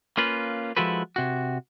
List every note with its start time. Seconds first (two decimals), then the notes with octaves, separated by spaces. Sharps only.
0.17 A#3 C#4 F4 B4
0.77 F3 G#3 E4 F#4 A4 B4
1.16 C3 F#4